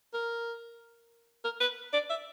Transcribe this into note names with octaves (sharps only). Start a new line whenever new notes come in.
A#4
A#4
B4
D5
E5